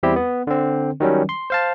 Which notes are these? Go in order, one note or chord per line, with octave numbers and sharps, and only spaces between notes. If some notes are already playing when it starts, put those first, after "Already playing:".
E2 G3 C4 E4 G4
B3
D3 C4
D#3 F#3 G3 C#4
C6
C5 F5 A5